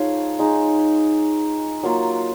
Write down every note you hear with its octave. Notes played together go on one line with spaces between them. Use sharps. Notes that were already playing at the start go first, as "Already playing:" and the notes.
Already playing: F3 G#3 D#4 F4 C#5 F5
G#3 D#4
F#3 A#3 F4